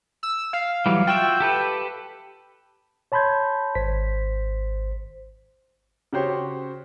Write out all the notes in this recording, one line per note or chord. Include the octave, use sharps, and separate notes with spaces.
E6
F5
E3 F#3 G3
F4 F#4 E5 G5
G4 A4 B4
C#5 A5 B5 C6 G6 G#6
G#1 C5 B6
C#3 F#4 G4 C5 C#5